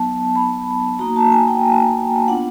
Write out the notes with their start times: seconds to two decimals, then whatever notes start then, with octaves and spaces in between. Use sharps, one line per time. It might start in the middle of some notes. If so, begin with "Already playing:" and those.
Already playing: F#3 B3 D#4 A5
0.36 B5
0.99 A#3 D#4 F#4 A#5
1.16 A5
1.32 G#5
1.48 G5
2.28 B3 D4 F4 F#5